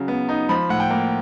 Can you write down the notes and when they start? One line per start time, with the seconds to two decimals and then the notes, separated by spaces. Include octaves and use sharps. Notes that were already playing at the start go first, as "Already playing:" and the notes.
Already playing: C#3 F#3
0.08 B3
0.29 D#4
0.49 F3 B5
0.69 A2 F#5
0.80 G5
0.90 A#3